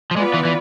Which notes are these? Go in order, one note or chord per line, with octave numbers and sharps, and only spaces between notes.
F3
G#3 B3 F4 B4 D5
E3
E3